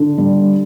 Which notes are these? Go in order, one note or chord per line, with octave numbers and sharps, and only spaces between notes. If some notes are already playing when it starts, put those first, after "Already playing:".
Already playing: D3
G3